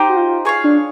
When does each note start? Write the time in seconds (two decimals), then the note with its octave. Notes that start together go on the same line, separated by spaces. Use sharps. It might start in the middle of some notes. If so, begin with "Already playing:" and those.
Already playing: D#4 G4 C5
0.10 F#4
0.17 F4
0.45 G#4 C#5 F5
0.64 D4